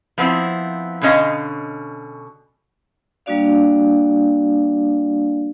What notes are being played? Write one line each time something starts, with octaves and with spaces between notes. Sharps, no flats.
F3 B3 C4 E4
B2 D3 C#4 D#5 F5
G3 A#3 D4 F#4 D5 F5